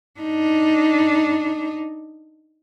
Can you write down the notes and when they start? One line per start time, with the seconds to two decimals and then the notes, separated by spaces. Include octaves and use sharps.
0.20 D4 D#4